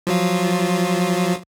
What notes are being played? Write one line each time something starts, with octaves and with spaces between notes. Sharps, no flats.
F3 F#3 F4